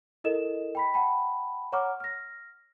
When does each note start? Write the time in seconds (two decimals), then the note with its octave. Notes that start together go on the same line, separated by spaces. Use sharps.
0.24 E4 A4 A#4 D#5 E7
0.75 G5 B5 B6
0.94 F#5 G5 A5 B5
1.72 C#5 F#5 A#5 C#6 D6 F6
2.00 F6 A#6